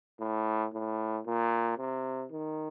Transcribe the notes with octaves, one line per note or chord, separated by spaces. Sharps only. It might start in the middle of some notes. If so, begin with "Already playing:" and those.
A2
A2
A#2
C3
D#3